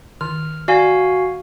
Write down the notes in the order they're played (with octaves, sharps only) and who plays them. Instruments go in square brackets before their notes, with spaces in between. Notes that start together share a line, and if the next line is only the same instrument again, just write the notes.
[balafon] D#3 [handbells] F6
[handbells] F#4 F5 G#5 [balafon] D5